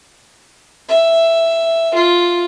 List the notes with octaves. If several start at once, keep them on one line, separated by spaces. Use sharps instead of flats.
E5
F4